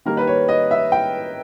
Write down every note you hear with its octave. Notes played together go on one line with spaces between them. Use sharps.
D#3 G3 A#3 A#4
B4
C#5
D#5
E5
G5